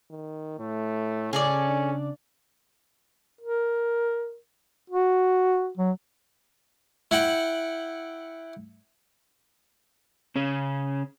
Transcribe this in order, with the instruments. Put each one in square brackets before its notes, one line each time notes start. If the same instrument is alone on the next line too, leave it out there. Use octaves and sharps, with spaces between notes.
[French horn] D#3
[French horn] A2 [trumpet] A3
[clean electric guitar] C#3 D5 [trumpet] C#4 [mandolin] G#4 A4 G#5
[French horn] D4
[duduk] A#4
F#4
F#3
[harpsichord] E4 F#5 G5
[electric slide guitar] C#3 C#4